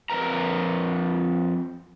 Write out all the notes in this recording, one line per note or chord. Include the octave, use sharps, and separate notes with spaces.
F2 A#4 B4 A#5